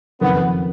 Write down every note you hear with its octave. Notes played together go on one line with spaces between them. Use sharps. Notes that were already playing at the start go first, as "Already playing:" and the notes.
F#1 F2 D#3 B3